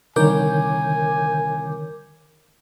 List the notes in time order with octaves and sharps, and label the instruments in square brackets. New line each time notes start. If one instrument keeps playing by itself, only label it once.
[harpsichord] C2 [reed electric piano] D3 D#3 C#5 [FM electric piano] A#4 D6 G6 [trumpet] G#5